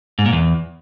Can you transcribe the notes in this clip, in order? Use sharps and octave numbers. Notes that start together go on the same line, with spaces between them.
G#2
A#2
E2